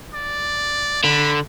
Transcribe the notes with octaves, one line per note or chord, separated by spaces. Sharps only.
D5
D3 B5